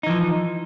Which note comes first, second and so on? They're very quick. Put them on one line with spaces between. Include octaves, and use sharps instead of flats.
D#4 E3 F3